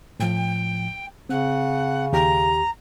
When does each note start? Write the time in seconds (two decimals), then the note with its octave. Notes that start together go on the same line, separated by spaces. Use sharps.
0.19 A2 F3 G5
1.29 C#3 C4 F#5
2.13 D#2 G4 A#5